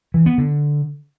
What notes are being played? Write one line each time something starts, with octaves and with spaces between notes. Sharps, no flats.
E3
B3
D3